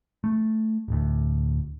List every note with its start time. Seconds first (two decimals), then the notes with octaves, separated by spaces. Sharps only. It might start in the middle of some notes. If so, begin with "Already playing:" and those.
0.24 A3
0.88 D1 D2